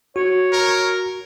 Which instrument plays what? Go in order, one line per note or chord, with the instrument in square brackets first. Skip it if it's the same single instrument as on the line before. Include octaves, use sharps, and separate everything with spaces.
[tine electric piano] F#4 [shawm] C#5
[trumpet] A#4